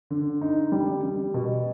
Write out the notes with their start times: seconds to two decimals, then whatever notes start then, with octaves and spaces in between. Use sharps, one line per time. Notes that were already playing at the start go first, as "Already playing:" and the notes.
0.10 D3
0.41 D#4
0.72 G3
1.04 G3
1.34 B2